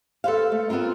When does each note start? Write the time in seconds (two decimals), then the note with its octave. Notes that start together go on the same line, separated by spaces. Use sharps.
0.24 A4 B4 C5 F5
0.52 A3
0.69 B3 C4 D#4 F4 A#4